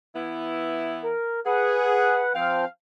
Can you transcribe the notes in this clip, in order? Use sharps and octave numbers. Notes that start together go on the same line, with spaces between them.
E3 B3 E4
A#4
G#4 B4 F#5
F3 C4 F5 G5